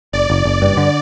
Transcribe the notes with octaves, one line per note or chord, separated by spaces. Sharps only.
F#1 D5
F#1
F#1
G2
D3